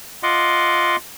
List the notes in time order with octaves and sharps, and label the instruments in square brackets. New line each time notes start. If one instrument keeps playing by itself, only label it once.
[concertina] F4 D#5 F#5 C6 D6